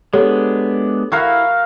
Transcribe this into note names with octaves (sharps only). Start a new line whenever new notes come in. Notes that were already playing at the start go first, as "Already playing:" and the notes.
G#3 B3 D4 G4 A4 C#5
E4 F#4 A#4 F5